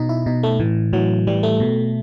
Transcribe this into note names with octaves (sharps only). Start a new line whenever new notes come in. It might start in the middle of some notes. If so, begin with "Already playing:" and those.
Already playing: B2 D#4
E4
B2 D#4
A3
A2 E3
A2 E3 F#3
A2 E3 G3
A3
B2